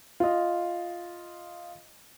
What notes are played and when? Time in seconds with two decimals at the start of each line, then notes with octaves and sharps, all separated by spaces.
0.20 F4 D#5